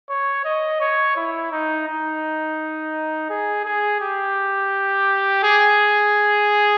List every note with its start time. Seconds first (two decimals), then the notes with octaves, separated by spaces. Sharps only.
0.10 C#5
0.45 D#5
0.80 C#5
1.16 E4
1.52 D#4
1.87 D#4
3.30 G#4
3.65 G#4
4.00 G4
5.43 G#4